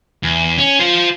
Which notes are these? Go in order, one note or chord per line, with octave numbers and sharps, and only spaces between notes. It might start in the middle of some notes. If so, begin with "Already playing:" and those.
E2
C#4
F4 C5